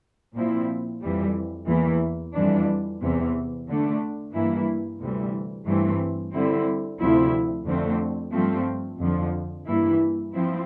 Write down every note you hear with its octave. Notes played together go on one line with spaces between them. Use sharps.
A#2 F3 C4 E4
F2 E3 G3
E2 E3 A#3 E4
F2 E3 G3 D4
E2 C3 E3
D3 A3 D4
G2 E3 A#3 E4
D2 C3 E3 G3
G2 E3 A3 C4
D3 G3 C4 E4
D2 C3 F3 C4 E4
F2 D3 A3 C4
G2 F3 A3 C4
F2 D3 F3
G2 E3 A#3 E4
F3 C4 E4